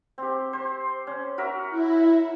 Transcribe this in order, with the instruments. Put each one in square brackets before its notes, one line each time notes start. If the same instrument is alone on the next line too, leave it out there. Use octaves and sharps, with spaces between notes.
[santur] C4 G4
C5
C#4
F#4 A#4 E5
[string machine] E4